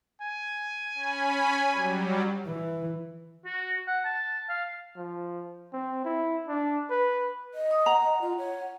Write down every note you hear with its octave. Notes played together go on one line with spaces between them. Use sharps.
G#5
C#4 B5
F#3 G3
E3
F#4
F#5
A5
F5
F3
C4
E4
D4
B4
D#5
D#6
F#5 A#5
F4
C#5